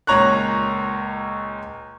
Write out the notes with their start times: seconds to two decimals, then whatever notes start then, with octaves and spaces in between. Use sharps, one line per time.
0.07 C#2 A#2 C#5 A#5 C#6 F#6